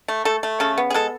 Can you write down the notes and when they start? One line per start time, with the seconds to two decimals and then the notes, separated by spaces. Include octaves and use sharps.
0.08 A3
0.25 A3 A4
0.43 A3
0.60 C#3 A4
0.78 B3
0.90 G#4
0.94 G#3 A4